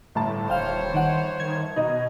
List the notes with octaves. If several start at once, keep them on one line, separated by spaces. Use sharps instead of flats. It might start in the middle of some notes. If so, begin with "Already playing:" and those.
G1 A2 A5
D#1 C5 C#5 F5 G5
D#3 F#5
D#3 G#6
B2 D#4 D#5